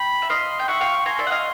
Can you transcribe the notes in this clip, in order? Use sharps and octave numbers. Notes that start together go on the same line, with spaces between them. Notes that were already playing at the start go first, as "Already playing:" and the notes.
Already playing: G5 B5
E5
D#5 F5 C6
G5
E5 F#5 C#6
F5 G5
G#5 A#5 C6
D5 E5
F#5
D#5 F5